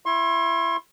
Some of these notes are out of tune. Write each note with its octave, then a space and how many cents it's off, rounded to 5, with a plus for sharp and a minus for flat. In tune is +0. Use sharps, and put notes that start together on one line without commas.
E4 +20 C6 +45